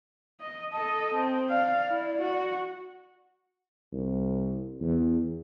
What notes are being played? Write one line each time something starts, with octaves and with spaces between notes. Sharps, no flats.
D#5
A4 D#5 A5
C4
D5 F5
E4
F#4
C2
E2